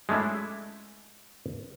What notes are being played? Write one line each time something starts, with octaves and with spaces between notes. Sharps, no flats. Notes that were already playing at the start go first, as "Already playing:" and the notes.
G#3 A3 C#4 D4 E4